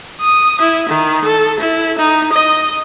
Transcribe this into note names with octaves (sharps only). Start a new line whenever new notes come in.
D#6
E4
D#3
A4
E4
D#4
D#5